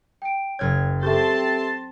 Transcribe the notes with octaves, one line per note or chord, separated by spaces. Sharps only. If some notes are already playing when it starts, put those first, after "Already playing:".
G5 D7
F#1 C#5 F6 G#6
C4 G4 A4 E5 A5 C6 G6